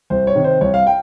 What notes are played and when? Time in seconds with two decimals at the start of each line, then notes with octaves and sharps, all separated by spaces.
0.10 C2 C5
0.27 C#5
0.35 C3 D#3
0.44 C5
0.61 C2 C#5
0.74 F5
0.87 G5